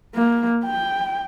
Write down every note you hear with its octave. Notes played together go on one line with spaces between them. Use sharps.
A#3
G5